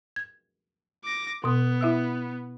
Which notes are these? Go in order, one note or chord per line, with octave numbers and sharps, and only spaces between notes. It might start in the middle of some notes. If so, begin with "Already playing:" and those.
G#6
D6 A#6
B2 B3 D#6
E4 E5 E6